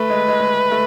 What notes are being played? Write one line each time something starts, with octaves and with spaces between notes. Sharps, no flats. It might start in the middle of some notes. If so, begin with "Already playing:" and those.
Already playing: A3 B4
G#3
G#3
G#3
A3